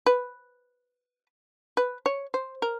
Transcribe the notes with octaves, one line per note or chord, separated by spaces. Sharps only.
B4
B4
C#5
C5
A#4